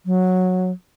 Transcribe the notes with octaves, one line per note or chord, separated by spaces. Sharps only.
F#3